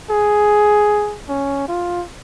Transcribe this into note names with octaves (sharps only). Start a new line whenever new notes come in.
G#4
C#4
F4